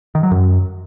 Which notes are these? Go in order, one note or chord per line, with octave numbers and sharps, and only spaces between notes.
D#3
F#3
F#2